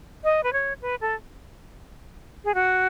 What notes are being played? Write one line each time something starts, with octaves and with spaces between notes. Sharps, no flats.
D#5
B4
C#5
B4
A4
G#4
F#4